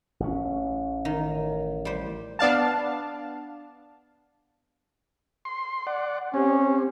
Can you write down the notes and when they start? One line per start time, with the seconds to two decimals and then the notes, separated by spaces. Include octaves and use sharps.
0.20 A1 C#4
1.05 D#3
1.85 G3 C5
2.39 B3 D4 F5 A5
5.45 C6
5.87 D5 F#5
6.34 C4 C#4 G4